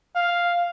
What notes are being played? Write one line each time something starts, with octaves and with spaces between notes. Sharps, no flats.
F5